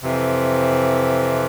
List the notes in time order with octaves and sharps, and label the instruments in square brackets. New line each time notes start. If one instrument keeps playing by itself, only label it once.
[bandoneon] F2 C3 E3